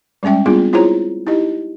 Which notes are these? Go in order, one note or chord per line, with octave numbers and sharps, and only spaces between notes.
G3 G#3 C#4 E5 G5
G3 B3 C4 D4 F4 G#4
E4 F4 G#4 C5 C#5 A#5
D#4 E4 G4 D#5